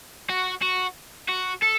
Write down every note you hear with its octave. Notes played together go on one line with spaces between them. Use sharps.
F#4
F#4
F#4
A4